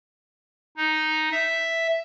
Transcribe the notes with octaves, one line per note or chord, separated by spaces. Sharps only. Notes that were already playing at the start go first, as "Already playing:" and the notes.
D#4
E5